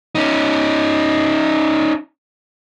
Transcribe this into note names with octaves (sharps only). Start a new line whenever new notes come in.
C#4 D#4